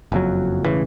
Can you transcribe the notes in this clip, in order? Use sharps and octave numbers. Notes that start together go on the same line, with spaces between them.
F#1 F2 F#3
E1 A1 C#3 E3